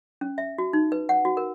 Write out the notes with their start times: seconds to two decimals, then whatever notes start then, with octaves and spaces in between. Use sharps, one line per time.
0.21 C#4
0.38 E5
0.58 F#4
0.73 D#4
0.92 B4
1.09 F#5
1.25 F#4
1.37 A#4